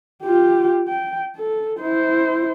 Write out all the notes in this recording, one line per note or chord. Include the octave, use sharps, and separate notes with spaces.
F4 G4
G5
A4
E4 C5